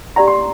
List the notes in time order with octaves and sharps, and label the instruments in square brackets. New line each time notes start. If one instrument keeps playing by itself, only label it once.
[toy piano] D4 G4 D5 F#5 [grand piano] A#5
[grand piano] C6